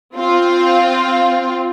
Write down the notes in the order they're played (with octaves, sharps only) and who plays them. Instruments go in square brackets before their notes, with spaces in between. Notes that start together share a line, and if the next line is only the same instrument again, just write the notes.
[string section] C4 F4